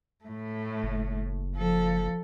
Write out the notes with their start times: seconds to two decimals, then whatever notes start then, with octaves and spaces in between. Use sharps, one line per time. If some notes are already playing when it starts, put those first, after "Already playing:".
0.25 A2 A3
0.83 F#1
1.56 F3 A4